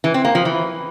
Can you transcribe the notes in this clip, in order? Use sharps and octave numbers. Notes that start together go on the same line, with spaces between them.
E3
C4
A#3
F3
E3